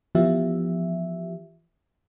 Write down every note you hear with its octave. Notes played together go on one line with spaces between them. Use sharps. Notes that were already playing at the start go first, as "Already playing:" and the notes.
E3 F3 B3 F4 G4 E5